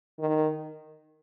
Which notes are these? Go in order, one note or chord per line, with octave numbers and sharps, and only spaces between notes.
D#3